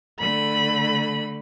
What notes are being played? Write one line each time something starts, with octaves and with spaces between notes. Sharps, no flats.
D3 A3 B5